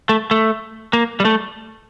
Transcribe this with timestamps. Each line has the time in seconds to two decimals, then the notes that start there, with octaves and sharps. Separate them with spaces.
0.09 A3
0.31 A3
0.93 A#3
1.20 G3
1.25 A3